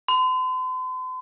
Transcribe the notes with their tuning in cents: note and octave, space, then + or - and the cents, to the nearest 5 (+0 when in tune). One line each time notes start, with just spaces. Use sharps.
C6 -45